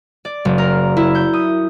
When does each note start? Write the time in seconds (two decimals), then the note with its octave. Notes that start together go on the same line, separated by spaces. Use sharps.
0.25 D5
0.45 F#1
0.58 A#4
0.97 E4
1.15 G6
1.33 D#6